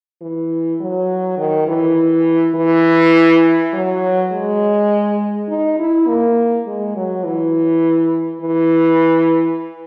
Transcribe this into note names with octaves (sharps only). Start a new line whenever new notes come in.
E3
F#3
D#3
E3
E3
F#3
G#3
D#4
E4
A#3
G#3
F#3
E3
E3